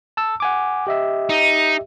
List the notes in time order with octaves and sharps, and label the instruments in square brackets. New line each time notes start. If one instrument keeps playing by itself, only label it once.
[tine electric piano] A5 E6
F#5 G#5 D6
G4 D#5 E5
[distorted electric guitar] D#4